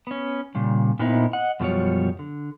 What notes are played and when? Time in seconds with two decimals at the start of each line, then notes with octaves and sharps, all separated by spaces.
0.07 B3 C#4
0.55 A#2 C#3 G3
0.99 A#2 B3 C4 D#4 E4
1.33 D#5 F#5
1.60 F#2 B2 F3 G3 F#4 C#5
2.19 D3